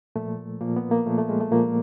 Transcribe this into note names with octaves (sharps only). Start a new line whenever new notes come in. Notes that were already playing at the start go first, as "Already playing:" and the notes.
A#2 F3 A3
A#2 F3 A#3
B3
A#3
A#2 F3 A3
A3
G#3
A3
A#2 F3 A#3